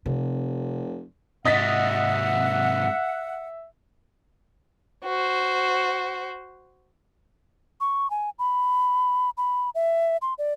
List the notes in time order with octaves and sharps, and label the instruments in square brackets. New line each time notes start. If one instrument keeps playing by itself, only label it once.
[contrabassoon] F1 [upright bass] C3
[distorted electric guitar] G#2 C3 [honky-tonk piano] D#5 A6 B6 [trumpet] E5 [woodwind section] F#5
[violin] F#4 C5
[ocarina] C#6
G#5
B5
B5
E5
C6
D5